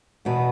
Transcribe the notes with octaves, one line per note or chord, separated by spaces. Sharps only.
E2 B2 B3 F#4 B4